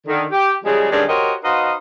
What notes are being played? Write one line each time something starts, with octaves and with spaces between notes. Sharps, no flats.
D3 D#3
G4
C#3 F3 G3 G#3
G2 D3 D#3 G#3 C#4 D4
F#4 G4 A#4 C5 C#5 D#5
D#4 F#4 B4 C5 D#5 F5